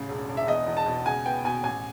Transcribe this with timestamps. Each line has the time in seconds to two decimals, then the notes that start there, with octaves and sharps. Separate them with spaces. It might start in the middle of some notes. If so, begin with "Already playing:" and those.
Already playing: A1 C#3
0.09 E1
0.29 E1
0.37 E5
0.47 E2 D#5
0.66 E2
0.77 A5
0.86 B2
1.05 C#2 G#5
1.26 B3 G5
1.44 B2 G#5
1.63 A1 G#5